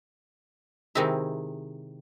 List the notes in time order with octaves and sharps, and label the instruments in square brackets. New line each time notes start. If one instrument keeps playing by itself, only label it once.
[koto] C3 D#3 G#3 C4 E4